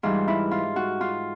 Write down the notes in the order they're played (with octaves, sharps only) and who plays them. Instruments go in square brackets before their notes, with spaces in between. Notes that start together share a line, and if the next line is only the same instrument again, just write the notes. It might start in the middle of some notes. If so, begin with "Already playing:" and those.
[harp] G#2 E3 G3 F4
E4
F4
F#4
F4